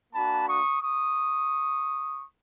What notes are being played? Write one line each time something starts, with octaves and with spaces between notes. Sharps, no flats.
A#3 D4 F#4 A5 B5
C#6 D#6
C#6 D#6